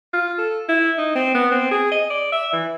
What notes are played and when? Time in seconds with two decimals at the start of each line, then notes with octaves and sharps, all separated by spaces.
0.14 F4
0.39 A4
0.69 E4
0.98 D#4
1.16 C4
1.35 B3
1.52 C4
1.71 G#4
1.92 D#5
2.10 D5
2.32 E5
2.53 E3